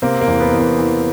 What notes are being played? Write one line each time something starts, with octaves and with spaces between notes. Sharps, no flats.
C3 A#3 C4
A#3
E2
B3
E2
A#3
E3